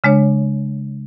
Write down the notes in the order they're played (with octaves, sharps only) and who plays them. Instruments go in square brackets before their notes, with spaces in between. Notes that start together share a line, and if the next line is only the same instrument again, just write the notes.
[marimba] C#3 G#3 D4 C#5